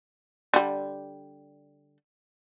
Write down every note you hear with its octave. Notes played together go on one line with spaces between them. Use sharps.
D3 G3